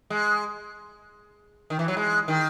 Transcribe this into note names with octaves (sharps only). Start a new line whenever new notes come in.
G#3
D#3
E3
F#3
G#3
D#3